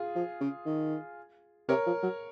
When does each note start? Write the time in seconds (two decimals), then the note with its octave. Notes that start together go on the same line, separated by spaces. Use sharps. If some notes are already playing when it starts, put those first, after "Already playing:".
Already playing: F4 G#4
0.15 F3
0.40 C#3
0.66 D#3
1.68 C3 A#4 C#5
1.86 F3
2.02 F#3